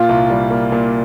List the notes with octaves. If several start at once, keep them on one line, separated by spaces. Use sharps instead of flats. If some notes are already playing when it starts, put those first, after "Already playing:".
Already playing: A#2 F4
C2
G3
A#3
A#2